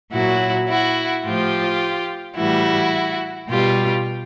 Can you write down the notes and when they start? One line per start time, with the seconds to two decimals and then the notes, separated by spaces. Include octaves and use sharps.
0.12 A#2 F#3 E4 F#4
0.69 E4 F#4
1.25 A2 F3 F4 G4
2.37 A2 E3 G3 E4 F#4
3.49 B2 G3 F4 G4